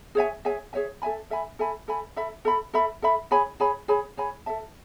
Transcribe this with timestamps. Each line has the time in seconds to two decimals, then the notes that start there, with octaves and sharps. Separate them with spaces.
0.15 G#4 C#5 E5 G#5
0.45 G#4 C#5 E5 G#5
0.73 G#4 C#5 E5 G#5
1.02 A4 E5 G#5 B5
1.30 A4 E5 G#5 B5
1.59 A4 E5 G#5 B5
1.88 A4 E5 G#5 B5
2.16 A4 E5 B5
2.45 A4 E5 B5
2.74 A4 E5 B5
3.02 A4 E5 B5
3.31 G#4 C#5 G#5 B5
3.60 G#4 C#5 G#5 B5
3.88 G#4 C#5 G#5 B5
4.17 G#4 C#5 G#5 B5
4.46 A4 E5 A5